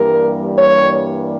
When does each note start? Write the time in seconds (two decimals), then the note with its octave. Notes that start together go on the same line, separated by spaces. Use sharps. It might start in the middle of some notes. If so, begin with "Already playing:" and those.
Already playing: G2 E3 G3 A#3 A#4
0.58 C#5